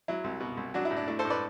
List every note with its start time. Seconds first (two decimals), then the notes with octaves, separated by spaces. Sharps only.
0.08 F#3 E4
0.24 C2
0.40 B2
0.57 C2
0.74 F#3 D4 F#4
0.85 E4
0.90 A2
0.97 D4
1.08 A3 E4
1.19 A4 C5
1.25 A2
1.30 B4 D5